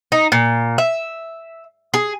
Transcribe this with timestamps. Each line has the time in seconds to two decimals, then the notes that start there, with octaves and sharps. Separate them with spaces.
0.12 D#4
0.32 A#2
0.78 E5
1.94 G#4